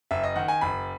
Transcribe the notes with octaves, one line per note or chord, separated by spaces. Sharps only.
F#1 E5
D#5
D#3 F#5
G#5
F#1 B5